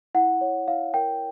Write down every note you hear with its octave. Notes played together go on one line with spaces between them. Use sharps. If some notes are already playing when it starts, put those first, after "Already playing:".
E4 F#5
C#5
E4 F5
A#4 G5